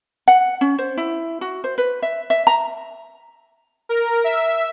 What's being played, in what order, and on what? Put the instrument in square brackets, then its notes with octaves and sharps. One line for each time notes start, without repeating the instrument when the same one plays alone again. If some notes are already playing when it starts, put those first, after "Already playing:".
[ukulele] F#5
C#4
C5
E4
F#4
C5
B4
E5
E5
A#5
[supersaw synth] A#4
E5